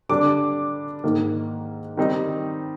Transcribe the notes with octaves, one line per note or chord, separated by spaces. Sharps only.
D3 G3 D4 D6
G#2 D#3 A#3
D#3 G3 C4 D#4